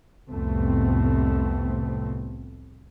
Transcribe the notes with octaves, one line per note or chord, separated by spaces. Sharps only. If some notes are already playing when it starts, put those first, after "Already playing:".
C2 F2 A2 A3 B3 C4